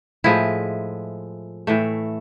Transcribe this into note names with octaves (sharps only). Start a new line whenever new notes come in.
A2 F3 G#3 E4
A2 E3 A3